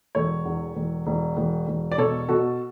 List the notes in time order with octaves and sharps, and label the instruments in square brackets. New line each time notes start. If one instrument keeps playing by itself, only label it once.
[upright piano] E1 A4 C#5
E2
E1
E1
E1
E1
D5
B2 A4 C#5
B2 F#4 A4